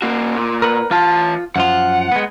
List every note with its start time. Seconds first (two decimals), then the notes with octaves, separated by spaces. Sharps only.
0.02 A#3 F#4
0.36 A#2
0.62 A#4 B4 F#5
0.91 E3 F4 A5
1.56 F#2 F3 F4 F#5
2.12 G#3 B3